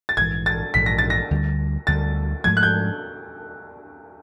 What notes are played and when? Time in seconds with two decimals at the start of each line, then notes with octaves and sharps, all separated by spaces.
0.09 A6
0.17 A#1 G#2 E3 G#6
0.46 A6
0.74 A#1 G#2 E3 B6
0.86 A#6
0.98 A6
1.10 A#6
1.31 D2 D3 G3
1.87 D2 D3 G3 A6
2.44 G#2 F3 A3 G#6
2.57 F#6
2.63 G6